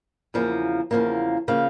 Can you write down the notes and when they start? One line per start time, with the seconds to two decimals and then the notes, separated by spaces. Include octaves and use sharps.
0.34 E2 C#3 F3 A#3
0.91 E2 C#3 F3 A#3
1.48 C#3 F3 A#3 F5